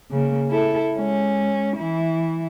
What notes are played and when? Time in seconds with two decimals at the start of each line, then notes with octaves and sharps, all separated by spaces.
0.11 C#3 A#3
0.50 E4 A4
0.93 G#3 C#4
1.77 E3 E4